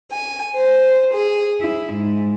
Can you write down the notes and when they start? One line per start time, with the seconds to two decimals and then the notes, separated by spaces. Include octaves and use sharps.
0.11 G#5
0.56 C5
1.13 G#4
1.61 E4
1.92 G#2